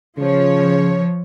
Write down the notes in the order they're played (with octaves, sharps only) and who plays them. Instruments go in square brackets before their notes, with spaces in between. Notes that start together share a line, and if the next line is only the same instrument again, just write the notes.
[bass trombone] C#3 [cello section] F3 C#5